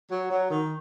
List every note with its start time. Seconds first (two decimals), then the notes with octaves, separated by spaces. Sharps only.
0.11 F#3
0.30 F#3
0.50 D#3